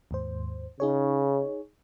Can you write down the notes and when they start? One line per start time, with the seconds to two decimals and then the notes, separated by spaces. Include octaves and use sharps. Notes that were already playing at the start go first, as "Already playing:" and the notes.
0.11 D#2 G#2 C5
0.80 C#3 D#4 G#4 C#5